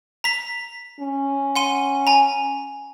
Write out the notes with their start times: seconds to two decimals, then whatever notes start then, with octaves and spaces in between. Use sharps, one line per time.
0.24 A#5 B6
1.00 C#4
1.56 F#5 C6 D#7
2.07 G#5 A#5